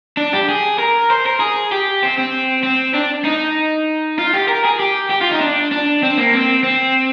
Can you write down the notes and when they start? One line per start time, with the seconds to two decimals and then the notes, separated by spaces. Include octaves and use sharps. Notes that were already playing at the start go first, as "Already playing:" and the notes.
0.17 D4
0.33 G4
0.49 G#4
0.79 A#4
1.10 C5
1.26 A#4
1.40 G#4
1.72 G4
2.03 C4
2.18 C4
2.63 C4
2.94 D4
3.25 D#4
4.18 F4
4.34 G4
4.48 A#4
4.64 G#4
4.79 G4
5.10 G4
5.21 F4
5.31 D#4
5.41 D4
5.72 D4
6.03 C4
6.18 A#3
6.33 C4
6.64 C4